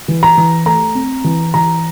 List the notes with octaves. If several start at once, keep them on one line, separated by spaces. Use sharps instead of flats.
E3
A#5
E3
A3 A#5
C4
E3
E3 A#5